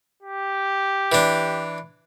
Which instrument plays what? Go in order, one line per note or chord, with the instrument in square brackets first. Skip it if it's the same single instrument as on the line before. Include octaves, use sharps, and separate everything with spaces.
[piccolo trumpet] G4
[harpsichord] E3 D4